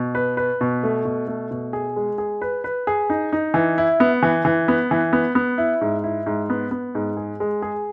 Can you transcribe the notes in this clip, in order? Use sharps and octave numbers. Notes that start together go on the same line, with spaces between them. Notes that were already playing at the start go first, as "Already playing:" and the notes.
Already playing: B2
B4
B4
B2
A3
B2
A3
B2
G#4
G#3
G#4
B4
B4
G#4
D#4
D#4
E3
E4
B3
E3
E3
B3
E3
B3
B3
E4
G#2
E4
G#2
B3
B3
G#2
G#4
G#3
G#4